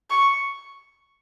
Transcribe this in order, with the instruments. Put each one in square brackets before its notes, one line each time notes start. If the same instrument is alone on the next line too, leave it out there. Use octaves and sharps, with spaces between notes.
[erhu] C#6